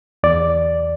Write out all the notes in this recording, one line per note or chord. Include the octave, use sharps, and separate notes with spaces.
E2 D5